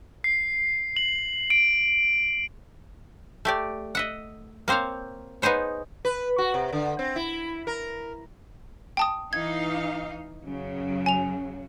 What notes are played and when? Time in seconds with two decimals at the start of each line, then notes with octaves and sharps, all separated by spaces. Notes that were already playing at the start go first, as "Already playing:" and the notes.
0.24 C7
0.97 F#7
1.50 D7
3.45 A3 G4 D5
3.95 D#5 E5 F#5
4.68 A#3 C4 C5 C#5 F5
5.42 B3 D#4 G#4 C5 C#5
6.05 B4
6.38 F#4
6.54 C3
6.73 D3
6.99 C4
7.16 E4
7.67 A#4
8.97 G5 A5 D#6
9.33 E3 D#4 F5 G#6
10.44 F#2 C#3 F#3
11.06 G#5 F7